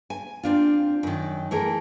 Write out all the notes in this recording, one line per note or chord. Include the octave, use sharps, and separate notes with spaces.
G#5
C4 D4 F4
F#2 D#3
E3 A3 G#4 A#4